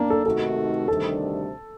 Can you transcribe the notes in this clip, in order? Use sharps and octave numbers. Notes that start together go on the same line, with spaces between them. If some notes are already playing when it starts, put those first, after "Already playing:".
Already playing: A#3 D4
A4
C3 D#3 A3 D#4 F#4 A4
D2 C3 D#3 G3 D4 A4